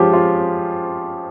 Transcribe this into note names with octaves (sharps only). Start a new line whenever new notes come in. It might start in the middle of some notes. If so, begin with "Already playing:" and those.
Already playing: F3 G#3 C#4 F4 G4
F4